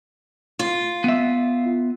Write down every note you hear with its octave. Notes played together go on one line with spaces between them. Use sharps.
F4
B3 E5